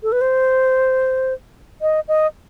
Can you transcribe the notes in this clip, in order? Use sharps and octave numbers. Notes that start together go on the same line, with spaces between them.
A4
B4
C5
D#5
D#5